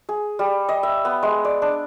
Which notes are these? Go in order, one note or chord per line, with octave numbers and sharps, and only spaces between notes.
G#4
G3
D#5
E5
B3
G#3
D5
D4